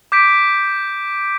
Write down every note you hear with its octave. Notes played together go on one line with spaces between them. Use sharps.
D6 G6 B6 D7